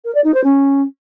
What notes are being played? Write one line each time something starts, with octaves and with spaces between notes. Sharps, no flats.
A#4
D5
D#4
C5
C#4